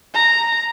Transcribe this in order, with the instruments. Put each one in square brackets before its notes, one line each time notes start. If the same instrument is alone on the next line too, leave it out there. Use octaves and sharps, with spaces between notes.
[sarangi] A#5